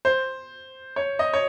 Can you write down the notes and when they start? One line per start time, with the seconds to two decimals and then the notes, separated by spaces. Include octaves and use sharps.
0.05 C5
0.96 C#5
1.19 D#5
1.34 C#5